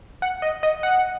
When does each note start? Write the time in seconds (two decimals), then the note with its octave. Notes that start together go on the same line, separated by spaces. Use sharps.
0.22 F#5
0.42 D#5
0.63 D#5
0.83 F#5